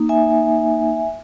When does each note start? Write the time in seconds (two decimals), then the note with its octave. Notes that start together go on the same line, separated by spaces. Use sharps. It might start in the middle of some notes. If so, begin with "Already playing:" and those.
Already playing: A#3 D#4
0.09 E5 G#5